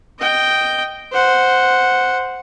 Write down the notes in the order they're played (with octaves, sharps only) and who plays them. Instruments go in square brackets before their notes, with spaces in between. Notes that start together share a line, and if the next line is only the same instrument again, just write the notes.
[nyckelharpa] D#5 G5
C5 F#5